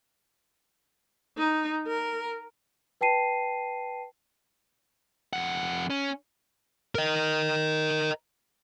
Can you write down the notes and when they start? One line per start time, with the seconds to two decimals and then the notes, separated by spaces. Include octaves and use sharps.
1.38 D#4
1.87 A#4
3.01 B4 G5 A5 C7 D#7
5.33 F2 F#5
5.90 C#4
6.95 A#4 D#5